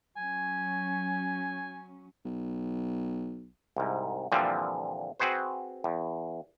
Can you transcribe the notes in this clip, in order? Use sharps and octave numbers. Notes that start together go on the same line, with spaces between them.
F#3 C#4 G#5
B1
C2 G#2
A#2 D3 E3 F3 G3 C4
C4 F#4 G#4 B4 C5
E2